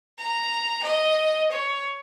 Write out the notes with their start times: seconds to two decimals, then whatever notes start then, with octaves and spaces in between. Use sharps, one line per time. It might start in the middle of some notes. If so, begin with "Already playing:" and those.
0.19 A#5
0.83 D#5
1.51 C#5